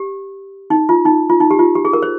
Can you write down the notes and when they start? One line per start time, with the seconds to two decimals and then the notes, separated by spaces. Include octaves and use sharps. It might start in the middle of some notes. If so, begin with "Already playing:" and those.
Already playing: G4
0.70 D#4
0.89 F4
1.05 D#4
1.29 F4
1.40 D#4
1.51 G4
1.59 F4
1.75 G4
1.85 G#4
1.93 A#4
2.02 C5